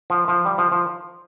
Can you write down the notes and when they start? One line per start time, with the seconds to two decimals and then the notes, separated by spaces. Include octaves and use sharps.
0.10 F3
0.28 F3
0.45 G3
0.58 F3
0.72 F3